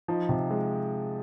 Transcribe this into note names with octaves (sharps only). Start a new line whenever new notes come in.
F3 D#4
C3
G#3